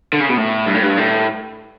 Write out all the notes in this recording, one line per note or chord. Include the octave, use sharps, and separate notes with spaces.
D3
C#3
B2
A2
G2
A2
G2
A2